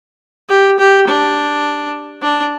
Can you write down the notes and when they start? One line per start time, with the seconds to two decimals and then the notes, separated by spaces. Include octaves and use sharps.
0.49 G4
0.79 G4
1.07 D4
2.22 D4